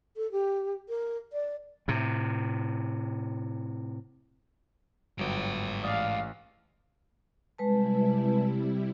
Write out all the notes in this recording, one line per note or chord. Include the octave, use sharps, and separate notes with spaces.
A4
G4
A#4
D5
A2 C3
G1 G#2 F#3 G5 D7
A1 D5 F5 D#6
C3 G3 G#3 E4 B4 A5